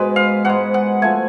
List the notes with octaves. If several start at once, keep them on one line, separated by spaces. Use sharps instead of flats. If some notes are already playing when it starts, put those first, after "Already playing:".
Already playing: G#2 B2 G#3 B4
F5
G#2 G#3 F#5
F#5
F3 A3 G#5